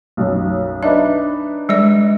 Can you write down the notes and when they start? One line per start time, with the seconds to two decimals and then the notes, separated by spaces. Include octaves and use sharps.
0.17 B1 F#2
0.83 D4 D#4 B4 E5
1.69 G3 G#3 D5